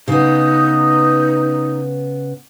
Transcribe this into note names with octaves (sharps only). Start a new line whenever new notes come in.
C#3 B3 D#4